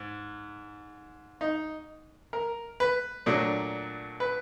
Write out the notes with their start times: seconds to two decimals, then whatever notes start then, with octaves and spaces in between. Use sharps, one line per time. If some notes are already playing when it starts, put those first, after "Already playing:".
Already playing: G#2
1.41 D#4
2.33 A#4
2.80 B4
3.26 A#2 F#3 A3 D4
4.20 B4